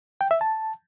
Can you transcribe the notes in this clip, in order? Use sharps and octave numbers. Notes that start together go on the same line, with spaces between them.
G5
E5
A5